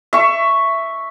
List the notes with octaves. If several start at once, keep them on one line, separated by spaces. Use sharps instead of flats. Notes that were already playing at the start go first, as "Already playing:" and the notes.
E5 C#6